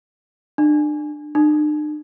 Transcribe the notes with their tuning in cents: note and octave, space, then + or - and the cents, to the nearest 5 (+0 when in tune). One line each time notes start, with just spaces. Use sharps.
D4 +35
D4 +45